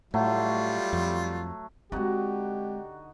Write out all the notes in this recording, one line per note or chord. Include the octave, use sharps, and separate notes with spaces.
A2 F#3 G3 A3 F4
F2
D3 G#3 C4 D#4 F#4 G4